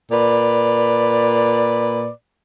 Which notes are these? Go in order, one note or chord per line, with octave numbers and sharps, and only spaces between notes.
A#2 B4 D5